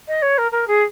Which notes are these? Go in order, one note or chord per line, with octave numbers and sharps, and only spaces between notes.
D#5
C#5
A#4
A#4
G#4